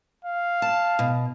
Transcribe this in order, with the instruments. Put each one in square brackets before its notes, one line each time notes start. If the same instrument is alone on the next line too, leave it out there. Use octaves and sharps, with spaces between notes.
[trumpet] F5
[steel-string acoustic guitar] A5
B2